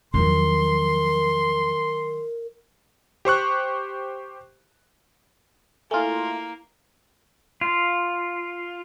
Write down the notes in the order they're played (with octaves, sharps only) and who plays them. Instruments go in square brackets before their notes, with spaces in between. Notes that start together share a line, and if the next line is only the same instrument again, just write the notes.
[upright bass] E2 F3 [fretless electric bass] D#3 F#3 [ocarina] A#4 [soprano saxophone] C6
[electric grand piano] G4 C5 C#6 F#6
[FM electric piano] A3 F4 [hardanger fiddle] A#3 [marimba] E4 F5 G#5
[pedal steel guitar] F4